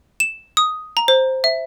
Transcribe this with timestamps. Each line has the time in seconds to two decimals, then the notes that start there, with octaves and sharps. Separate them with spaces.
0.20 E7
0.57 D#6
0.97 A#5
1.08 C5
1.44 E5